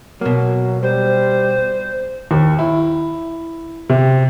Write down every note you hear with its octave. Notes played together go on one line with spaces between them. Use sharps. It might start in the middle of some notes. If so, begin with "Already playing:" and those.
B2 F#3 A#3
G3 C5
D#2
E4
C3